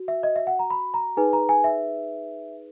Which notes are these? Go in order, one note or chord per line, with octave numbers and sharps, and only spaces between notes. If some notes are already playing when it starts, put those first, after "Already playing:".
Already playing: F#4
E5
D#5
E5
F#5
A#5
B5
A#5
D#4 G#4 B4 G#5
A#5
G#5
E5